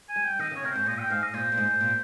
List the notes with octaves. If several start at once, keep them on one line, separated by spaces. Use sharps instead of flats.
G#5
G3
G5
D#3 D#5
C#3
C#5
C3 A#4
G#2 C5
A#2 D#5
G5
G#2 F5
D#5
A#2 C5
A#2
G#2
A#2